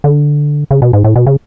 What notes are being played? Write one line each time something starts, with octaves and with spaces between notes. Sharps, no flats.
D3
C#3
B2
G#2
A2
B2
C#3